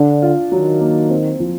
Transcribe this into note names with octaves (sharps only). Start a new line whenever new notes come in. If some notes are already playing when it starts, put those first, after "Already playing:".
Already playing: D3 D4
F4
D#3 F#3
A#3
C4
F3